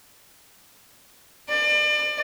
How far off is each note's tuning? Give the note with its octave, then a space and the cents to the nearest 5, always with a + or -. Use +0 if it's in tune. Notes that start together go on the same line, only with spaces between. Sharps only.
D5 +35